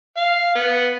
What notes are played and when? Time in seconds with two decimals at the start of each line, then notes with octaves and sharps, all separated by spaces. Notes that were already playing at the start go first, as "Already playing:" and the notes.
0.17 F5
0.55 B3